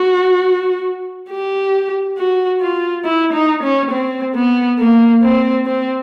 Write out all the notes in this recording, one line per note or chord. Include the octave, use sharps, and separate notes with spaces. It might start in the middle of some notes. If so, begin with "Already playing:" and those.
Already playing: F#4
G4
F#4
F4
E4
D#4
C#4
C4
B3
A#3
C4
C4